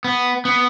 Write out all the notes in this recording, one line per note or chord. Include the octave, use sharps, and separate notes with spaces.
B3
B3